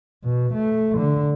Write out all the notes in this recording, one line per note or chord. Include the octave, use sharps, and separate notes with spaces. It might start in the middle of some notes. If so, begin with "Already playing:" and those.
B2
A3
D3